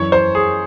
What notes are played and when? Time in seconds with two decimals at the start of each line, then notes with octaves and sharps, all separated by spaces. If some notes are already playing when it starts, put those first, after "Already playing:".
Already playing: F#2 E3 C#5
0.12 C5
0.35 G#4